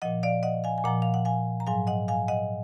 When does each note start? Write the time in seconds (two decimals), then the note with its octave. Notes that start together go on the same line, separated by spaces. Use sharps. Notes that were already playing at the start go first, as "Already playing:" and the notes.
0.02 A#2 F3 D#5 F#5
0.23 D5 F5
0.43 D#5 F#5
0.64 F5 G#5
0.78 G#5
0.84 A#2 F3 F#5 A#5
1.02 F5
1.14 F#5
1.25 F5 G#5
1.60 A#5
1.67 G#2 F#3 F5 G#5
1.87 D#5 F#5
2.08 F5 G#5
2.28 D#5 F#5